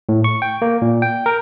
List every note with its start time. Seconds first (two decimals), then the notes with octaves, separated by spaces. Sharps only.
0.09 A2
0.24 C#6
0.42 G5
0.62 A#3
0.82 A#2
1.02 G5
1.26 A#4